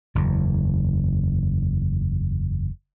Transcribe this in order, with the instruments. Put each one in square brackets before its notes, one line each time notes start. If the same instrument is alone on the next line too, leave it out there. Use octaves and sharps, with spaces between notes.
[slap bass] F#1 E2